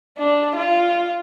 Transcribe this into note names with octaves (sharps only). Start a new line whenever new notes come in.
D4
F4